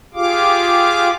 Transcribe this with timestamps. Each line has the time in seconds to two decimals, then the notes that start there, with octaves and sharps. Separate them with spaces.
0.14 F4 G4 G#4 F5 D6